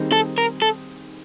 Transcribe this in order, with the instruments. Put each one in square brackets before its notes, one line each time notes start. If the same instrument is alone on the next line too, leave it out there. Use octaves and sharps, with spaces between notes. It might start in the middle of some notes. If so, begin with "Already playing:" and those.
Already playing: [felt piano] D#3 G3 C4 D#4 G#4
[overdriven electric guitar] A4
A#4
A4